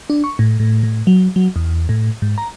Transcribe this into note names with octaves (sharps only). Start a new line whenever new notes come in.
D4
C#6
A2
A2
A2
F#3
F#3
E2
A2
G#2
A#5